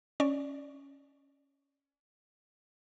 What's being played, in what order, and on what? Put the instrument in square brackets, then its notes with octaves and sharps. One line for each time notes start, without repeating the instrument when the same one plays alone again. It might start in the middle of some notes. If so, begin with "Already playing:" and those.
[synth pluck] C#4 D5